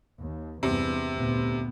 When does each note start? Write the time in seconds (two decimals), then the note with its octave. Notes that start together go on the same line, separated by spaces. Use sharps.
0.20 D#2
0.63 E2 G2 C3
1.12 D2 A#2 B3